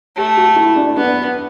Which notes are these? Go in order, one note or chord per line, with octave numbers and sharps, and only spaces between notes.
A3 G4
F#4
E4
D4
B3 D4